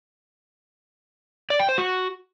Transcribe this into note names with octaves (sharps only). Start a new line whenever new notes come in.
D5
G5
C5
F#4